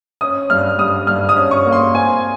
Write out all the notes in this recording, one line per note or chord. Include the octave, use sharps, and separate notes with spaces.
C#4 D#6
G2 F6
G3 D#6
G2 F6
D#6
C#4
C#6
A#3
C6
C4 G#5